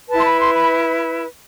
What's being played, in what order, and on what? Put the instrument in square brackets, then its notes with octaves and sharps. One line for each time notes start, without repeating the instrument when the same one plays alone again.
[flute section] E4 B4 A5
C6
B5
C6
B5